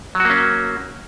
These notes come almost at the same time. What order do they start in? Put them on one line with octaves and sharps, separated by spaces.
F#3 F#4 A#3 C#4